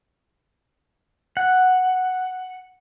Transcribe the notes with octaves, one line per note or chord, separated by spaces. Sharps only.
F#5